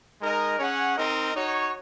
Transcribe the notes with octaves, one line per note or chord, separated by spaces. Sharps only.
G#3 D#4 A#4 D#5
C#4 G#4 C#5 F#5
C4 D#4 A#4 D#5
D#4 F#4 C#5